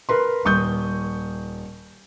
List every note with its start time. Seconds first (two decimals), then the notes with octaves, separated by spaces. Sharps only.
0.09 A#4 B4 C6
0.45 D#1 C#6 D#6 G6